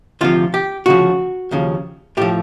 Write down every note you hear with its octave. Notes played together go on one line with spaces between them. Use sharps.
D2 C3 F3 F4
G4
D2 C#3 F3 F#4
D#2 C#3 F3
A2 F3 G4